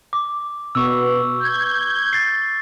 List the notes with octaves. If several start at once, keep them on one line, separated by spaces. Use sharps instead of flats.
D6
B2 B3 C#6 E6
G6 G#6
A6 C7